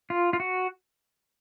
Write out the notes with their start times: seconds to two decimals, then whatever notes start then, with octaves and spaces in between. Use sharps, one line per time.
0.10 F4
0.33 F4
0.40 F#4